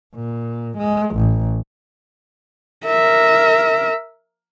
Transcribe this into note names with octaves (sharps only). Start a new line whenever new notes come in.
A#2
G#3
A1
A#4 E5